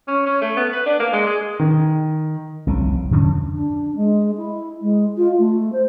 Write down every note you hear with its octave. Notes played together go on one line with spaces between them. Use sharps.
C#4
C#4
A3
B3
B4
D4
A#3
G#3
G#4
D#3
F1 C2 C#3
F2 D3 C#4
D4
G#3
E4
G#3
F4
A3
C5